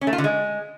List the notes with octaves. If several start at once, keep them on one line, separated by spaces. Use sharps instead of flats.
C#4
A3
F4
D3
G#3